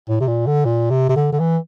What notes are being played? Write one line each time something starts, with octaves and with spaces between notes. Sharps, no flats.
A2
C3
A#2
D3
A#2
C3
C3
D3
D3
E3